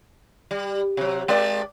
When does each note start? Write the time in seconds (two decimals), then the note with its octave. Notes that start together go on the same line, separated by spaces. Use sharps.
0.51 G3
0.97 C3 F#3
1.28 G#3 D5